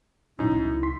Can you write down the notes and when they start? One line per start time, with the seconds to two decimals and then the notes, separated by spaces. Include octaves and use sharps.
0.39 A#1 F#2 D#4 E4
0.51 C#2
0.83 C6 B6